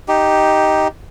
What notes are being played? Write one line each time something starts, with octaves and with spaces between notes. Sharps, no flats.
D#4 G4